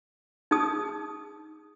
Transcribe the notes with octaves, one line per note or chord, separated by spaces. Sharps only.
D#4 G#4 A5 D#6